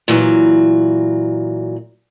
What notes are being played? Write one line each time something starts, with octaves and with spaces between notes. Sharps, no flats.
A#2 E3 F#3